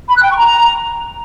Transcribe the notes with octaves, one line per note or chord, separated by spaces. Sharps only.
B5
F#6
G5
C#6
A#5